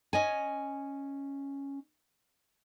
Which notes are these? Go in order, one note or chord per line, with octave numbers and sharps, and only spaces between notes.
C#4 D#5 G#5